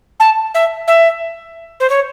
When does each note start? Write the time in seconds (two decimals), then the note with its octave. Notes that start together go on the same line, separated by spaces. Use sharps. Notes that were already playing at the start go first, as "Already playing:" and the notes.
0.20 A5
0.54 E5
0.88 E5
1.80 C5
1.90 C#5